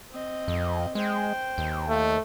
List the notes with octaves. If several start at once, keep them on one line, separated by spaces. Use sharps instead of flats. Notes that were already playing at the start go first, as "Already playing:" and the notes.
C4 D#5
F2
G#3 C5 G5
D#2
A3